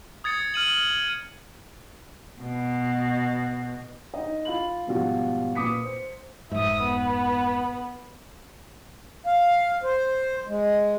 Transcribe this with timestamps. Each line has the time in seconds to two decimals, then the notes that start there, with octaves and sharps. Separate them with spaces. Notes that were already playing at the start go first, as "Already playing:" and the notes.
0.24 D#6 G#6 A6 C#7
0.54 F6 D#7 F#7
2.40 B2
4.14 D#4 D#5
4.45 F4 F5 B5 F#7
4.87 G#2 B2 F3 G3 F4 F#4
5.55 A#2 B4 D6 D#6 B6 C#7
5.85 C5
6.52 F1 G#2 E5 D#6
6.81 B3
9.27 F5
9.83 C5
10.47 G#3